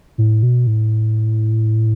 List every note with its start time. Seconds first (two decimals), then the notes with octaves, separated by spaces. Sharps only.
0.18 A2
0.43 B2
0.67 A2